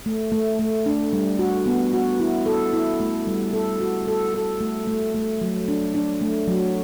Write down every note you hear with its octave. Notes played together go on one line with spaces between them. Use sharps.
A3
A3
A3
D4
G3
F#4
B3
F#4
E4
A4
E4
A3
G3
A4
F#4
A4
A4
A3
A3
A3
F#3
D4
D4
A3
F#3